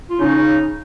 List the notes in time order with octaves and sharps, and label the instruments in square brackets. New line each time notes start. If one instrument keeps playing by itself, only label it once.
[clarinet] F4
[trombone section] C#3 C#4 [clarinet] D#4